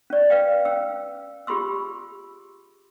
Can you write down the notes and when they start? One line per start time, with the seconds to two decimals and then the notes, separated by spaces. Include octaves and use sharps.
0.10 C#4 D5
0.30 B4 F5 G5
0.65 C#4 G5 E6
1.47 F4 G4 G#4 B5 C6 E6